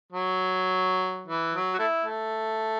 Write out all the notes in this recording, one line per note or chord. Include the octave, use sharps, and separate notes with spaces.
F#3
E3
F#3
F#4
A3 E4
A3